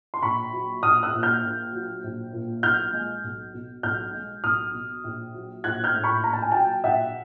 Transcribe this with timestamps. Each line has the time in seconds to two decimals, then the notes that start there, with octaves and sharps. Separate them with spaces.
0.14 C6
0.23 A#1 B5 C#6
0.53 F#3
0.83 A#1 D#6 F6
1.03 E6 F#6
1.13 A#2
1.23 F6 G6
1.43 A#1
1.73 F#3
2.04 A#1
2.33 A#2
2.63 B1 F6 G6
2.93 G#3
3.23 B1
3.53 B2
3.83 B1 F6 G6
4.13 G#3
4.44 B1 D#6 F6
4.73 B2
5.04 A#1
5.34 F#3
5.64 A#1 F#6 G#6
5.84 F6 G6
5.94 A2
6.04 B5 C#6
6.24 A#1 A#5
6.33 A5
6.42 G#5
6.52 F#3 G5 A5
6.84 A#1 E5 F#5